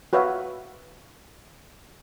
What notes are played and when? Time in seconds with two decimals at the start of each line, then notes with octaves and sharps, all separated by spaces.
0.13 F#4 B4 C#5 E5 F5